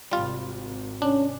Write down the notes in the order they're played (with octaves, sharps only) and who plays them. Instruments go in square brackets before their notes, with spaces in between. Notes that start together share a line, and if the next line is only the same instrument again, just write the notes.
[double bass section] G#1 C3 [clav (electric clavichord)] G3 F4
[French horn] C#4 [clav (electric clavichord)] D4